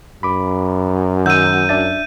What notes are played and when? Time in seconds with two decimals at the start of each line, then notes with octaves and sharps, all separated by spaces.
0.23 F#2 B5 D6
1.26 D#3 F#5 E6 G6 D#7
1.69 D4 E5 A6